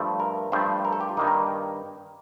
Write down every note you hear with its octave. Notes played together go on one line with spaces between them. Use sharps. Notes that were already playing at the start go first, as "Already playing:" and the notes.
Already playing: G2 F3 A3
A#4
G2 F3 A3 C5
A#4
A4
G4
F4
G2 D#3 A#3 D#4
A#4